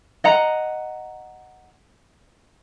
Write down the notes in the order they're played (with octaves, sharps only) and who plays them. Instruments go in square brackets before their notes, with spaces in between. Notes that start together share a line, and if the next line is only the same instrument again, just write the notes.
[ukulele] D#5 F#5 A#5